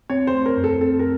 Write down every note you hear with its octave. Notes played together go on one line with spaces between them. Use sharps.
C4 C#5
C5
A3
A#4
F#2
A4
C4 A4
A#4